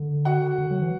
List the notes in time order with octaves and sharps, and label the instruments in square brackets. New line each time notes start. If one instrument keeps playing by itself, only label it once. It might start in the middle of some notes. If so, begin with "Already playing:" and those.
Already playing: [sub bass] D3
[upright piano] F#4 F#5
[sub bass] D3
F#3
E3